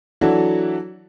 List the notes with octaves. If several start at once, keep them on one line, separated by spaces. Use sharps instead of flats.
E3 F#3 D4 E4 F#4 A4